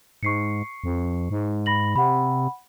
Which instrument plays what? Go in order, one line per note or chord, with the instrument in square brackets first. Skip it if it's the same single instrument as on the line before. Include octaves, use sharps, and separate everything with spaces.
[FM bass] G#2 [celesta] C#6 C7 C#7
[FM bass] F2
G#2
[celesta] B5 A#6 F#7
[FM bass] C3 [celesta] F#5 B5